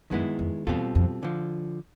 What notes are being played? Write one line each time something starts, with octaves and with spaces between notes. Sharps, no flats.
F#2 D#3 G#3 B3 E4
F2
E2 B2 G3 C4 F4 A4
F2
D3 F3